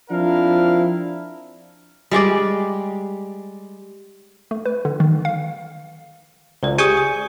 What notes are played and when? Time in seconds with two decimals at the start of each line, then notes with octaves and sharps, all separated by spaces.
0.11 F3 C4 D4 E4 A#4 F5
2.11 G3 G#3 G4 D5
4.51 A3
4.66 B4
4.85 D3
5.00 D#3
5.25 F5
6.63 C#2 C5 D5
6.78 G4 G#4 G#5 C#6 D#6 G6
6.97 D#6